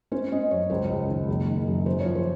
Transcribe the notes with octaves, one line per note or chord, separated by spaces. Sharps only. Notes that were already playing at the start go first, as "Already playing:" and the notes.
C#4 C5
C#4 D#5
F#2 C#5
C#2 C5
C#2
D#3
F#1
D#3
F#2
F#2 C5
C#5
F3
C5